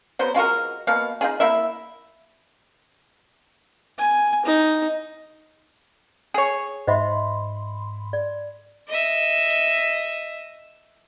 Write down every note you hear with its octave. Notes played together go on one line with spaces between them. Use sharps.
F#3 B3 C5
G#3 F4 F#4 A#4
B2 A#3 F5
D#4 F4 G#4
A#3 E4 E5
G#5
D#4
G#4 C#5
G#2 C5 D#5 E5 B5 C6
D5
D#5 E5